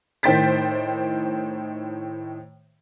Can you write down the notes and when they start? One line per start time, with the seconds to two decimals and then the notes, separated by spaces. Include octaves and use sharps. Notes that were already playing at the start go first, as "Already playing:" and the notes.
0.23 A2 D#3 C5 G5 A6 B6